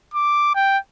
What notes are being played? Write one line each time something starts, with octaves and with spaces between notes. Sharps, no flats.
D6
G5